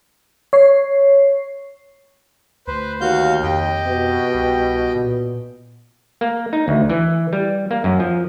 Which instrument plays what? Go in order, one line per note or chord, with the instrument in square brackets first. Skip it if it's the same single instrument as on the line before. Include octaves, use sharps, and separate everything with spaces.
[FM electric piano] C#5 C7
[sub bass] D2 [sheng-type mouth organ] B4 C5
[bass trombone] D#2 [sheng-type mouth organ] F#4 F5 G6
[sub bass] F2 [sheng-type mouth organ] G4 D#5 G5
[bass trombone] B2
[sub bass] C2
A#2
[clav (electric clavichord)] A#3
D#4
D2
E3
G3
A#3
F#2
F3